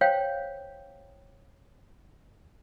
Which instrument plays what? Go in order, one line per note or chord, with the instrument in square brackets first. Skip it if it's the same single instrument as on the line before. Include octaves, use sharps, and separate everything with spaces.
[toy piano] C5 C#5 F5 G5